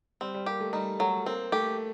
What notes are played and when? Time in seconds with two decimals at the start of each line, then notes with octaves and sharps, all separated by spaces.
0.21 G3 C4
0.34 G3
0.46 A#3 G4
0.60 A3
0.73 G3 D#4
0.99 F#3 A3
1.26 A#3 C4
1.52 A3 G4